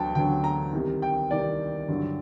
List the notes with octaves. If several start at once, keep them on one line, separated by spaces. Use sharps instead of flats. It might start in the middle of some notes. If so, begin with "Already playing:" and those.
Already playing: D2 D3 F#3 G5 A5
D2 D3 F#3 G5
A#5
C2 C3 D#3
G5
C2 C3 D#3 D5
G2 D3 F#3